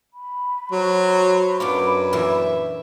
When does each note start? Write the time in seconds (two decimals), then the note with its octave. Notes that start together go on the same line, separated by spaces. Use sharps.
0.14 B5
0.72 F#3 F#4 C5
1.60 F#2 B3 D4 F4 D6
2.13 A#2 E3 A#4 E5